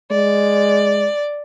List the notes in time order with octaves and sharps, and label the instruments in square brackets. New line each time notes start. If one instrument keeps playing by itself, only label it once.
[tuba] G#3 [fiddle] D5